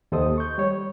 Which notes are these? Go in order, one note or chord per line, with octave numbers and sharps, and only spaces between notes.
D#2 G4 A4 C5 D#5 D#6
C#6 G6
G3 C#5